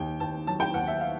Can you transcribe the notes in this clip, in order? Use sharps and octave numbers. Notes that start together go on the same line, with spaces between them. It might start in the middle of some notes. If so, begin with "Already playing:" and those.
Already playing: D#2 G5
D#2 A5
F#3 A5
G5
D#2 F#5
E5
F5